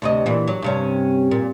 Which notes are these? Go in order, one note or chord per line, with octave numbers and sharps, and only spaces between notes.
D2 C3 D#5
A#2 E3
F#3
G2 C3 C#4
A#2